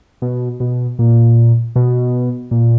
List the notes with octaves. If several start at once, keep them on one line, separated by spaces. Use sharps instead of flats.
B2
B2
A#2
B2
A#2